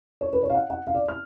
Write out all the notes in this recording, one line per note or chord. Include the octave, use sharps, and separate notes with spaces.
C#5
B4
C#5
F5
F#5
F#5
F5
D5
F6